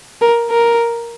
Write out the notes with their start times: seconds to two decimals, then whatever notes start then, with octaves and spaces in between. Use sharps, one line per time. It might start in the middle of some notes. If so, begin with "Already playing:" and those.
0.21 A#4
0.50 A#4